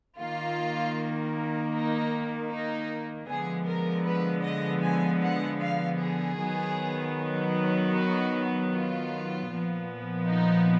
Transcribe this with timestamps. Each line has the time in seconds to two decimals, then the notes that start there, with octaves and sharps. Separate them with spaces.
0.18 D#3 A#3 F4
1.73 D#4
2.50 D#4
3.28 D3 F3 G#3 B3 G#4
3.66 A#4
4.05 B4
4.44 D#5
4.82 G#5
5.22 F#5
5.60 F5
5.99 G#4
6.38 D#3 F#3 B3
7.93 F#4
8.71 F4
9.48 A#2 F3 B3
10.26 D#4